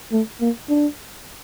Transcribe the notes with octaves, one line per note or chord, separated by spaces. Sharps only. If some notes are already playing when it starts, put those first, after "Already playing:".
A3
A#3
D4